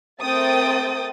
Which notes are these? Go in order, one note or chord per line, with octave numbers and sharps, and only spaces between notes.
A3 C4 A#4 G5 D#6 A6